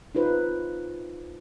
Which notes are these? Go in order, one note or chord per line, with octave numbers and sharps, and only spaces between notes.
D#4 F4 B4 C5